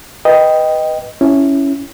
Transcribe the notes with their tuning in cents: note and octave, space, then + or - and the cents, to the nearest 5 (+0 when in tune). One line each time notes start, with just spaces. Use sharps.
B4 +0 D#5 +0 G5 +0
C#4 +0 E4 +0